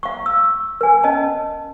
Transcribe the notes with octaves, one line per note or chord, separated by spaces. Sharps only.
F5 C#6
E6
A#4 G#5
C#4 D#5 A5